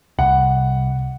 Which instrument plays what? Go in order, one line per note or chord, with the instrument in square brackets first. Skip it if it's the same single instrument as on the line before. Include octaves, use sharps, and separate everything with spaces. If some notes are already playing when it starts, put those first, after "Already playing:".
[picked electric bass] C2 [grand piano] F#5